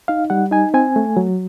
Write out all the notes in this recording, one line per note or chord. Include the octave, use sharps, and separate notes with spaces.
D#4 F5
G3 F#5
D#4 G#5
C4 G#5
A3
F#3